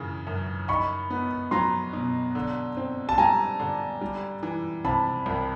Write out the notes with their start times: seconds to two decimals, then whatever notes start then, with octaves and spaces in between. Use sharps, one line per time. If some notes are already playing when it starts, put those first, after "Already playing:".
Already playing: F#2 C#3 E3
0.27 F#2
0.68 D#4 B5 C#6
1.10 B3
1.51 F#3 A#5 C6
1.93 B2
2.35 D3
2.77 C4
3.09 A5
3.18 G3 G#5 A#5
3.60 D3
4.01 G3
4.43 E3
4.84 C3 A5 B5
5.26 C2